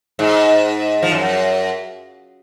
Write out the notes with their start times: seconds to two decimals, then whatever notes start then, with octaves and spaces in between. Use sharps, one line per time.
0.19 G#2
1.03 F3
1.12 F#2